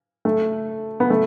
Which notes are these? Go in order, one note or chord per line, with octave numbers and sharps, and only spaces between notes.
A3
B3
A3